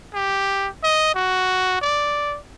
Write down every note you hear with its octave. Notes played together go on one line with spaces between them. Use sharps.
G4
D#5
F#4
D5